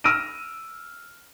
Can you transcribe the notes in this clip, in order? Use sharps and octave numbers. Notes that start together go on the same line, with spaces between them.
E6 F6 A#6 D7 D#7